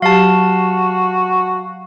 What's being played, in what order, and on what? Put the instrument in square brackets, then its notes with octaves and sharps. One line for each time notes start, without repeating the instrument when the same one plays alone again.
[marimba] F#3 G4 [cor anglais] F#4 [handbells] F5 A5